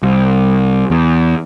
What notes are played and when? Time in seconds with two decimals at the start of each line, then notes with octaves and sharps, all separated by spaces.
0.03 C2
0.90 E2